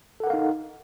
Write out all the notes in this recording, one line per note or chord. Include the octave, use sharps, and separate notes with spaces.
D#4 A4 A#4 F5 F#5